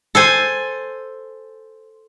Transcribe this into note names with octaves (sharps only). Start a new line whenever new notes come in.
A4 C5 G#5